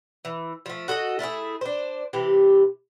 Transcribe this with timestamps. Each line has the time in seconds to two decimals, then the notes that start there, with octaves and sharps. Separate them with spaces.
0.25 E3
0.66 F3 A3
0.88 F#4 A4 D5 D#5
1.19 A3 E4 F4 G#4
1.61 D4 C5
2.13 C3 E3 G4